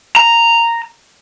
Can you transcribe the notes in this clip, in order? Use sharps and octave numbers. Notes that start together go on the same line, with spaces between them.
A#5